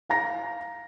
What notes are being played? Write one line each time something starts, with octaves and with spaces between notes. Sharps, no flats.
F5 A#5 A#6